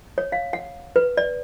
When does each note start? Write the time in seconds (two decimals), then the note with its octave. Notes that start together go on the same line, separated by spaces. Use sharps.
0.18 C#5
0.32 F5
0.53 F#5
0.96 B4
1.17 D5